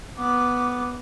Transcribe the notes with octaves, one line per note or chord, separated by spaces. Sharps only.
B3 D6